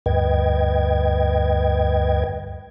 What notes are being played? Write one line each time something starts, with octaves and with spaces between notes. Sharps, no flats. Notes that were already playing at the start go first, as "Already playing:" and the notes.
D2 G2 B4 D#5 G5 G#6